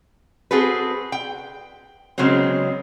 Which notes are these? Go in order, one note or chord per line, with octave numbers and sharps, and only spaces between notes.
C4 F#4 G#4 A4 B4
G5
C#3 F#3 G#3 B3 C4